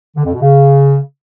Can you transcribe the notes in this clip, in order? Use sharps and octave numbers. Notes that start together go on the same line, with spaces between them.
D3
F2
B2
C#3